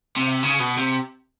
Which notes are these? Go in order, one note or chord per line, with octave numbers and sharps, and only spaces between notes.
C3
C#3
B2
C3